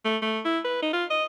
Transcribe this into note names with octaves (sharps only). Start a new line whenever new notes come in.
A3
A3
E4
B4
D#4
F4
D#5